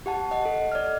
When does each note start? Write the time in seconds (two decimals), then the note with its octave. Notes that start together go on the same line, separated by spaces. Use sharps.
0.06 G4 F#5 A5
0.31 D#5 F#5
0.45 A4
0.72 D5 D#5 F6